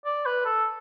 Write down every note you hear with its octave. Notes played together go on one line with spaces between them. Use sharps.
D5
B4
A4